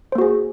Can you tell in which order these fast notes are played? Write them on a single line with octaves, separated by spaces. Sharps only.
C5 A#3 F#4 G#4